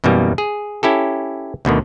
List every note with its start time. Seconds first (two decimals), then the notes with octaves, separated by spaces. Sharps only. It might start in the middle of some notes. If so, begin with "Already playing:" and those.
0.04 F#2 B2 E3 G3 A#3
0.38 G#4
0.83 C#4 E4 G4 A4
1.65 D2 B2 D3 D#3